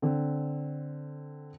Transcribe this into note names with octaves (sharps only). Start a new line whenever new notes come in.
D3 C4